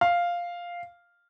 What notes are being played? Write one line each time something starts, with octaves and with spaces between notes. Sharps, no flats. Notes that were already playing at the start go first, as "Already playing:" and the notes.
F5